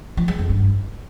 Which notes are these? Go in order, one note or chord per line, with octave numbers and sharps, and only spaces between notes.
F3
G#3
F2
G2